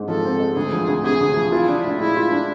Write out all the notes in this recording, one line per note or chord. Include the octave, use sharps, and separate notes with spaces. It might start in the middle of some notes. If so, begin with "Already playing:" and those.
Already playing: G#2 G#3
F3 A4
C4
G#3
D2 G#4
F3
D2
C3 G#4
D2
F3
E4 F4
D4
A2
G#3 E4
F4
D4